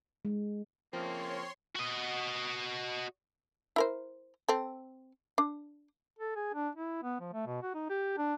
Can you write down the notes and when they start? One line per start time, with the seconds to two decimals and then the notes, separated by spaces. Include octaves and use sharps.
0.25 G#3
0.93 C#3 F3 A3 A#3 C4 C#5 C6
1.76 F#4 D#5
3.76 E4 A#4 C5
4.49 C4 A4
5.38 D4
6.19 A4
6.36 G#4
6.54 D4
6.76 E4
7.03 B3
7.20 F3
7.33 A3
7.46 B2
7.63 F#4
7.75 D#4
7.90 G4
8.18 D4